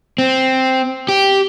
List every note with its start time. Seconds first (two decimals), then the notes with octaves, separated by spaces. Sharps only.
0.18 C4
1.09 G4